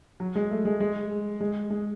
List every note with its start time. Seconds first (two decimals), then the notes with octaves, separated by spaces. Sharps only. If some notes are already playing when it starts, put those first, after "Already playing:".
0.20 F#3
0.35 G#3
0.51 A3
0.65 G#3
0.80 G#3
1.41 G#3
1.70 G#3